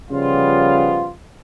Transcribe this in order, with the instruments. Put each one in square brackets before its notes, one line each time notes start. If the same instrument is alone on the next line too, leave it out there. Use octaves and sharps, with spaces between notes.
[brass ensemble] C#3 F3 G3 B3 F4